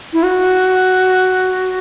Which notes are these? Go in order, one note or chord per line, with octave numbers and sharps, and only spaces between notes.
E4
F#4